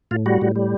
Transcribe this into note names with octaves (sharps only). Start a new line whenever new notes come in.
A2 F4
G3 F#4
A2
G3